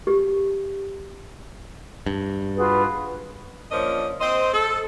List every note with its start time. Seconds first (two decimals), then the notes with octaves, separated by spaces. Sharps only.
0.07 G4
2.06 G2
2.56 F4 F#4 G#4 B4
3.72 A#2 F3 C#4 D4 A#4 D#5
4.21 C4 C5 D#5
4.54 A4